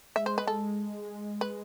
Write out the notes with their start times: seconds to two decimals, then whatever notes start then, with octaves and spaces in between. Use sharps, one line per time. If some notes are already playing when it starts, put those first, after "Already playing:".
0.16 G#3 E5
0.26 C5
0.38 B4
0.47 A4
1.41 B4